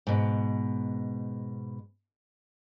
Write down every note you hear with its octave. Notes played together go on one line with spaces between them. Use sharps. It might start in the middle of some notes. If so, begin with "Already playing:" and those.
G#2 B2